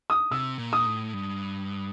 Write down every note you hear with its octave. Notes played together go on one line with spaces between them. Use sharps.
D#6
C3 E6
A#2
D#6
A2
G2